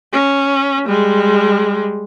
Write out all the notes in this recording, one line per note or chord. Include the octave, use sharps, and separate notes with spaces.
C#4
G3 G#3